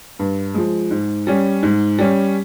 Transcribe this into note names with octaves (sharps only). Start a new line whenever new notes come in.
G2
F3 G#3
G#2
G3 C#4
G#2
G3 C#4